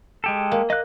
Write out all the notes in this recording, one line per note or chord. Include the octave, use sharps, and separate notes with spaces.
G#3 G4 A4
A#3
A#3 D#5 F#6